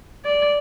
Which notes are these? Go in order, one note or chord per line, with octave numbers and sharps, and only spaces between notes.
D5